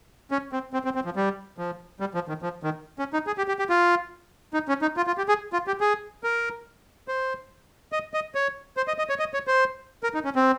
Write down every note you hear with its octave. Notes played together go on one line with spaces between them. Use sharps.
C#4
C4
C4
C4
C4
F3
G3
F3
G3
F3
D#3
F3
D#3
C#4
D#4
G#4
G4
G4
G4
F4
D#4
C#4
D#4
F4
F4
G4
G#4
F4
G4
G#4
A#4
C5
D#5
D#5
C#5
C5
D#5
D#5
C#5
D#5
C#5
C5
A#4
D#4
C#4
C4